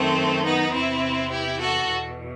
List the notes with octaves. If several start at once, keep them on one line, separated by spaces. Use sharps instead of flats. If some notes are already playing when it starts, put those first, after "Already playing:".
Already playing: F#2 D#3 A3 C4
B3 D#4
E2 C3 E3 C4 E4
E4 G4
F#4 A4
E2 B2